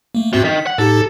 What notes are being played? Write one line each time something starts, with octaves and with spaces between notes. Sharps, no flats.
A3 A#3
G#2 C3 C4 F#4
D#3 B6
F#5
A2 D#4 G4 A4